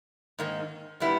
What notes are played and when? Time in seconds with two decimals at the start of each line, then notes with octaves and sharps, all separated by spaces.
0.39 G#2 D#3 A#3 D#4
1.00 A#2 G3 B3 E4